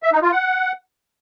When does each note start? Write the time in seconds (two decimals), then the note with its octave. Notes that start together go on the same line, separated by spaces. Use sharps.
0.03 E5
0.13 D#4
0.22 F4
0.32 F#5